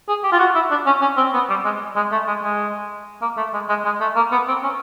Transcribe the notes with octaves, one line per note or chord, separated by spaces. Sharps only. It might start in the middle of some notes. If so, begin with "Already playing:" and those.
G#4
G4
F4
F#4
E4
D4
C#4
C#4
C4
B3
G3
G#3
G#3
A3
G#3
G#3
A#3
A3
G#3
G#3
G#3
A3
A#3
B3
C4
C#4